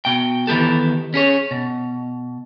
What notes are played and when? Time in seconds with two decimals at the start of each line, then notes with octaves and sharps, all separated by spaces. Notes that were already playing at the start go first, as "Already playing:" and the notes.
0.05 B2 G5
0.47 D#3 E3 B3 G4 A4
1.14 C#4 G#4 C#5
1.51 B2